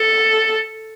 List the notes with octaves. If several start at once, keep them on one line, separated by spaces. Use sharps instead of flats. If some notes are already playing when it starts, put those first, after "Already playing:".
Already playing: A4